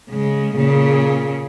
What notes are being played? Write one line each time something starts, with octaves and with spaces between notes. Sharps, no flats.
C#3 G#3
A#2 C#3